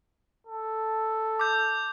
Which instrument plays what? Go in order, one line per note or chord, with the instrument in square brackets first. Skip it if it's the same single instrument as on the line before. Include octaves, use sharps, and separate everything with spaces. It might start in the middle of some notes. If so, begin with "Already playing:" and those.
[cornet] A4
[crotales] D6 G6